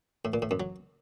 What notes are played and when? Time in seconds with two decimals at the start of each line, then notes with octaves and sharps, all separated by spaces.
0.25 A2
0.34 A#2
0.42 A2
0.51 F#2
0.60 F#3